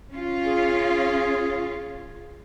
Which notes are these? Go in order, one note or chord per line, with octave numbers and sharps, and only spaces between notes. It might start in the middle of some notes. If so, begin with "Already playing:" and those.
C#4 F4
G#4